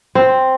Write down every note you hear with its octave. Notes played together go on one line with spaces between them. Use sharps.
C4